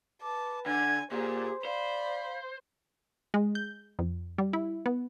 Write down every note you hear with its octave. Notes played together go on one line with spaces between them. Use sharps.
B4 A5 D6
D3 G#5 G#6
A#2 G4 G#4 C5
C5 D5 F5 B5
G#3
G6
F2
G3
E4
B3